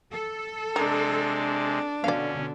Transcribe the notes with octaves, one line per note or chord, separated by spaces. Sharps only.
A4
C3 G#3 D4 A#4
B2 D3 C#4 D5 F5